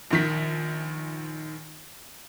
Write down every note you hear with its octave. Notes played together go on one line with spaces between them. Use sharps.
A#1 D#3 B6